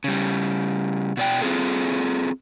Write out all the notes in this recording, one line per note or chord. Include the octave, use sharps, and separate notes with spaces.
C#3 G3
B2 D5 G5
C4 F4 G#4 A4